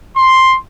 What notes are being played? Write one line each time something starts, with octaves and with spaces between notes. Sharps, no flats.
C6